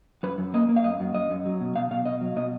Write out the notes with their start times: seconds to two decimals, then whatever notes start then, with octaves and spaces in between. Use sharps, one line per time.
0.23 F#2 B4
0.38 F#2
0.54 A#3 D#5
0.69 A#3
0.76 F5
0.84 F#2 D#5
1.00 F#2
1.15 F#2 D#5
1.30 F#2
1.46 F#3
1.61 B2
1.76 B2 F5
1.91 B2 F5
2.06 B2 D#5
2.21 F#3
2.36 B2 D#5